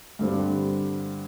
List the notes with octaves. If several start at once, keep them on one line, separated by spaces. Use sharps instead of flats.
G2 D3 G3 C4